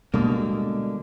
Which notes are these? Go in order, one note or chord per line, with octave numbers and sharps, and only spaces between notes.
B2 D3 G3 G#3 A#3